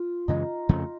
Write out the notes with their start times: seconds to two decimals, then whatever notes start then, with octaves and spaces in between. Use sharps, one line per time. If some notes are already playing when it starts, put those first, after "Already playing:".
Already playing: F4
0.28 F#2 C#3 E3 G#3 D#4
0.69 F2 C#3 F3 A3